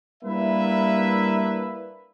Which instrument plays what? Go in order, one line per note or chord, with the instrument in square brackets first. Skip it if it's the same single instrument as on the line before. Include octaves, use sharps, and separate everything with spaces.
[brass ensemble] G3 A#3 D4 E4 B4 E5